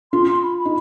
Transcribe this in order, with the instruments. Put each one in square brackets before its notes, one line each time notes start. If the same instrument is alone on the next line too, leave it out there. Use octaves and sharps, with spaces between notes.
[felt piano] F4 [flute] C6
[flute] C6
B5
B5
[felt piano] D#4